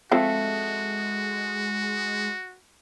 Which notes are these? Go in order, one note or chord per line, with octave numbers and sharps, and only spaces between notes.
F3 G#3 C4 F4 F#4 A4 E5 A5